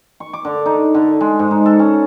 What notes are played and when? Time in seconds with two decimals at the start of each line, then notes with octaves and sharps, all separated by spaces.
0.20 C#6
0.33 D6
0.45 D3
0.66 D#4
0.95 D3
1.06 C#6
1.21 G#3
1.39 G#2
1.51 D#4
1.66 A4
1.79 C#4